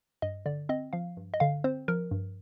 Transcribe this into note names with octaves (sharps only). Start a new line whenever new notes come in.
G2 D#5
D3 D5
C4 D#5
F3 F5
G2
D#5
D3 F5
C4 C5
F3 A#4
G2